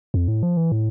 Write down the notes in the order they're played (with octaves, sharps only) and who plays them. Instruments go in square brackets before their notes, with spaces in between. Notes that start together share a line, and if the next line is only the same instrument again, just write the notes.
[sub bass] F2
A2
F3
E3
A2